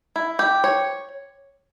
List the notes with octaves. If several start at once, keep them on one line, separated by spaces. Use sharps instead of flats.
E4
G4
C#5